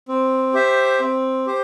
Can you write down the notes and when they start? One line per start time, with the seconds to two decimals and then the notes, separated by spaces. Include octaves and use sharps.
0.08 C4
0.54 G4 C5 E5
1.00 C4
1.46 G4 C5